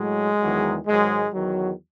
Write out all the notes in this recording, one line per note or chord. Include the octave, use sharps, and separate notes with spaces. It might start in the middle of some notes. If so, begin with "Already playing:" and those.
Already playing: A2 F#3 G#3
E2 D#3 F#3
G#2 D#3 F#3 G#3
E2 D#3 F#3